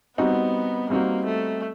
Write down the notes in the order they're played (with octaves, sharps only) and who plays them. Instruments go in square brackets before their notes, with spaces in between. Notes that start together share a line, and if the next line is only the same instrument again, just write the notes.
[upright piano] G3 C4 D#4 F#4 [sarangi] B3
[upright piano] G3 C4 D#4 F#4 [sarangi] A#3
[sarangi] A3